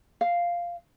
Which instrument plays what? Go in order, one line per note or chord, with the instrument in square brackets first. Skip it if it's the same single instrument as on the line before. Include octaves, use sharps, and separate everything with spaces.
[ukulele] F5